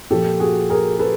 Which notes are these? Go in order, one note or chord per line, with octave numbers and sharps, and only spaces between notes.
A#2 F3 G4 A4
F#4 G#4
G#4 A#4
A4 B4